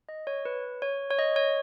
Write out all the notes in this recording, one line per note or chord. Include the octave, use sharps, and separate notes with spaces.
D#5
C#5
B4
C#5
C#5
D#5
C#5